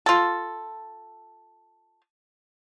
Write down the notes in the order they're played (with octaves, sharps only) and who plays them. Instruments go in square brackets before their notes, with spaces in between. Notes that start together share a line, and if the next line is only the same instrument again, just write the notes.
[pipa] F4 A4